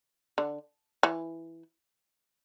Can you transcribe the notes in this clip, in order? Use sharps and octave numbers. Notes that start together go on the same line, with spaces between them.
D3
E3